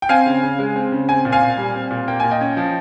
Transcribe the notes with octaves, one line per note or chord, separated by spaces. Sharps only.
G5
C4 F5 G#5
C#3
C#3
G#3
C4
C#3
C4 G#5
A#2
F5 G#5
A#2
G3
C4
A#2
A#3 G5
A#2 G#5
D#5 G5
C#4
F3